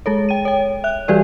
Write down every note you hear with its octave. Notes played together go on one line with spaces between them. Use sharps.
G#3 G#4 A4 C#5
G5 D#7
C#5 G5
E5 F#6
E3 G3 F#4 G4 B4 D5